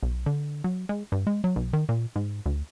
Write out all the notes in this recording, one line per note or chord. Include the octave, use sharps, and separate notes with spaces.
B1
D3
F#3
G#3
G2
G#3
F#3
B1
D#3
A#2
G#2
D2